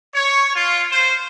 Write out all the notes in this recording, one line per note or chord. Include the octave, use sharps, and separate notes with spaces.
C#5
F4
C5